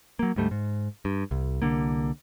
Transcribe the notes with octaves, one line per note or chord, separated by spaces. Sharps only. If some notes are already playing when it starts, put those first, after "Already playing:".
F#3 A#3
D2 G#2 G3 A3
G#2
G2
C2
C2 D3 A#3